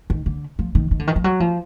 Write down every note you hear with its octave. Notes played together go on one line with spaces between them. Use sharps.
D#3
D3
F3
D#3
D#3
D3
D#3
F3
F#3
F3